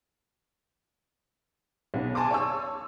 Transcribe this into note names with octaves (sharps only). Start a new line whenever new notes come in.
B1 B3
G#5 A5 C6 D6
C#5 C#6 E6